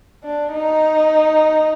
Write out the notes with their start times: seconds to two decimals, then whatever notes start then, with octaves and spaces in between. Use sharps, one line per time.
0.24 D4
0.54 D#4